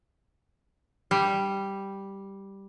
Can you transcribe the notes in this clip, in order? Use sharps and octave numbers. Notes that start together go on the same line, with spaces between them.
G3